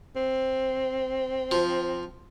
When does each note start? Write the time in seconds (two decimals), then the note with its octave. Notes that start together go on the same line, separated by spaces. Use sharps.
0.16 C4
1.51 F3